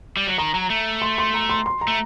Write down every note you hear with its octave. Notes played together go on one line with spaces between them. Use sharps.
G3
F#3
D#3 A#5
F#3
A3
C6
C6
A#5
C6
C6
A#5
A3